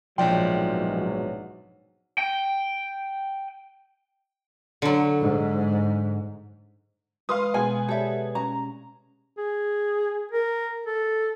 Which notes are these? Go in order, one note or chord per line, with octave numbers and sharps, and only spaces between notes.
A#1 G#2 B2 F3 F#3 D5 G5 C6
G5
D3 F#3
G#2
G#3 B4 F5 C6 D#6
B2 G#3 B3 G#4 G#5
G4 A4 C#5 D5 E5
C#4 A#5
G#4
A#4
A4